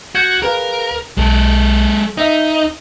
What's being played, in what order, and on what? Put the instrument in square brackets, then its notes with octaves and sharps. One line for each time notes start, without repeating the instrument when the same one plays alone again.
[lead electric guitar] F#4 [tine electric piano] G6 G#6 C#7
[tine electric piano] G#4 B4 F5 [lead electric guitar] A#4
[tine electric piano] B1 [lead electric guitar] G#3 A4
[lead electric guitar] D#4 [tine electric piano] D#5 E5